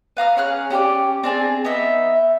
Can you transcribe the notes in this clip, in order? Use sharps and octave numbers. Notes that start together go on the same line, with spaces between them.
B4 F5 A#5 F6
C#4 G#4 F6 F#6
C#4 G4 B4 D5
C4 D4 G#4 G#5
B3 D#4 E5